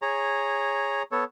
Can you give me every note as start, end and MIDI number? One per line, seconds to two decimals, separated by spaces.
0.02 1.03 68
0.02 1.03 73
0.02 1.03 82
1.12 1.24 59
1.12 1.24 69
1.12 1.24 73